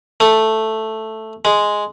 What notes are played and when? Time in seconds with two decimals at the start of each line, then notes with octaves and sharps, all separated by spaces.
0.20 A3
1.45 G#3